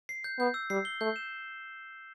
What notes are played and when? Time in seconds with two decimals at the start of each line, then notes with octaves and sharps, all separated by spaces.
0.09 C7
0.24 G6
0.39 B3 G6
0.54 E6
0.70 G3 C7
0.85 G7
1.01 A3 G6
1.16 E7